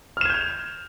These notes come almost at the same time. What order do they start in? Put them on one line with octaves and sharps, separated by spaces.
F6 E7 G#6 G6 F7